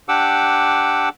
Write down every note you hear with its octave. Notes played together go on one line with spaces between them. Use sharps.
D4 G4 F#5 D6 E6